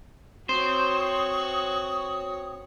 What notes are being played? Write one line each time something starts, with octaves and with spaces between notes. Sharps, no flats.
C4 F#4 C5 C#5 D#6